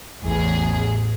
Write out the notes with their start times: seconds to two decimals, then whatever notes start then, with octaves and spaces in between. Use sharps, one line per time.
0.23 A1 E2 G#4